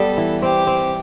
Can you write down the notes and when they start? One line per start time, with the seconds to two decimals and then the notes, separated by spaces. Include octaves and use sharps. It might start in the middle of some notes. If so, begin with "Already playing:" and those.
Already playing: G3 B3 A4
0.17 E3
0.42 C4 G4
0.67 C4